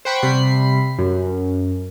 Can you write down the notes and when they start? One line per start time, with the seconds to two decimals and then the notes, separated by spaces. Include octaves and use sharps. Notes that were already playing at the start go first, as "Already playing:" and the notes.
0.05 C5 F#5 G5 B5 C#6
0.22 C3 G3 B5 C7
0.98 F#2